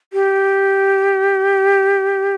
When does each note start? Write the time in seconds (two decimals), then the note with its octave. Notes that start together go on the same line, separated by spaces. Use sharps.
0.13 G4